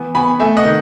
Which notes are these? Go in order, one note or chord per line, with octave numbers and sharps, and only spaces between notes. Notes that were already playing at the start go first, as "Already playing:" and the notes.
Already playing: E3 B3
B3 G#5 B5
A3 E5 G#5
D#5 F#5
D#3